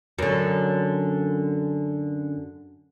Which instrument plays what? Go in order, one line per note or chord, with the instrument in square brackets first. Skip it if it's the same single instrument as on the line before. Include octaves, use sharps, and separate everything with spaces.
[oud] F#2 D3